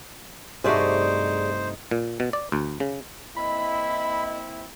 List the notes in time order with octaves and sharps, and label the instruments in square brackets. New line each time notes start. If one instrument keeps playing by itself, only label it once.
[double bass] G2 D#4 [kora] C3 A3 F#4 [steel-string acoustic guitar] G#4 D5 [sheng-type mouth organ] C5
[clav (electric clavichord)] A#2
B2
D5
D2
C#3
[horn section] A#3 C4 E4 [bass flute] D#5 [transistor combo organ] B5